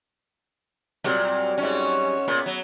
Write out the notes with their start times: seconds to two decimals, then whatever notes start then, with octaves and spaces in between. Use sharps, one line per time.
1.04 A#2 F#3 G3 C4
1.58 G#2 C#4
2.28 A#2 B3
2.46 F#3